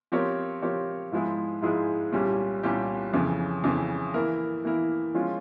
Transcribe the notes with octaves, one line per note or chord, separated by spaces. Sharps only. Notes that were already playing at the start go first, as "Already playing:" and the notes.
F3 C4 G4 A#4 C#5
F3 C4 G4 A#4 C#5
G#2 F3 G#3 E4 G#4
G#2 F3 G#3 E4 G#4
C2 A#2 G3 C#4 G4
C2 A#2 G3 C#4 G4
F2 C#3 E3
F2 C#3 E3
E3 A#3 E4 A#4
E3 A#3 E4 A#4
F3 G#3 C#4 F4